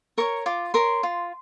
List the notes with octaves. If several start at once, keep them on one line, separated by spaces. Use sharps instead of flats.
A#4 C#5 C#6
F4 D6
A#4 C#5 C6
F4